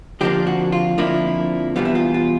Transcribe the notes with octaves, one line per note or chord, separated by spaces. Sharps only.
F2 D3 F3 A#3 D4 G4
F#4
F4
F2 D3 F3 A#3 D4 E4
E2 B2 G3 B3 F4
E4
F4
F4